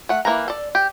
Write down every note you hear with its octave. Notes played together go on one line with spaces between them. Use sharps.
A3 F#5
E3 A#3 B4 A#5
A4 D5
G4